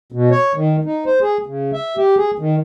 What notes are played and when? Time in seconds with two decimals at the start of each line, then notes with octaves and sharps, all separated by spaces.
0.12 B2
0.31 C#5
0.55 D#3
0.85 D#4
1.06 C5
1.21 G#4
1.46 C#3
1.73 E5
1.97 G4
2.17 G#4
2.39 D#3